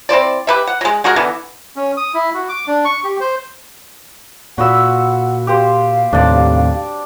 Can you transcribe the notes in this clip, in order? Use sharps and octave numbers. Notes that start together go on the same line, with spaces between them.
C4 E4 C5 D5
G4 B4 E5
F#5
F#3 G#3
G#3 F#4 G#4 A#4
D3 E3 B3
C#4
D#6
E4
F#4
D6
D4
C#6
G4
C5
A#2 F#4 F#5 B5 E6
G4 C5 F5
D#2 A2 C3 D4 D5